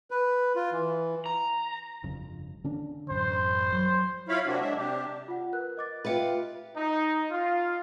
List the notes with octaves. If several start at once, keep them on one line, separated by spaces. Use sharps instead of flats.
B4
F4
E3
A#5
G1 F2 C#3
D3 C#4 D4
A1 F#2 C5
F#3
E4 F4 C#5 F5 B5
C3 A#3 C4 D4 F#4
F#3 G#3 D4 E5
C3 D4 G4
F4 F#5
A#4 B4 F#6
D#5 D6 A6
F4 G4 B4 D#5 E5 C#7
D#4
F4